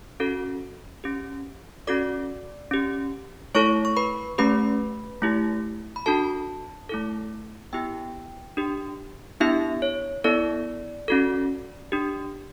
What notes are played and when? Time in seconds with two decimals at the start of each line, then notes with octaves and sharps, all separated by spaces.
0.20 C#4 F#4 A4
1.04 C#4 G4
1.87 C#4 F#4 A4 D5 D6
2.71 C#4 G4
3.55 A3 E4 A4 C#5 C#6
3.85 C#6
3.97 B4 B5
4.38 A3 C#4 G4 B4 B5
5.22 A3 E4 G4
5.96 B5
6.06 D4 F#4 A4 A5
6.89 A3 E4 A4
7.73 B3 E4 G4 G5
8.57 D4 G4
9.40 B3 D4 E4 G4 E5
9.82 C#5
10.24 B3 E4 A4 D5
11.08 C#4 F#4 A4
11.92 D4 G4